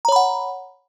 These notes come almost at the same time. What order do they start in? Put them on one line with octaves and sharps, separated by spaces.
A#5 C#5 B5 F#5